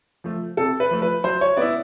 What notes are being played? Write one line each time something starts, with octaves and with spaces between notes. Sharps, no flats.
F3 A3
C3 A4
B4
F3 A3
B4
F#3 C5
C#5
B3 E4 D5